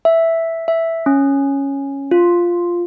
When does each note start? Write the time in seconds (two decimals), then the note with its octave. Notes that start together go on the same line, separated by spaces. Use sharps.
0.05 E5
0.68 E5
1.06 C#4
2.11 F4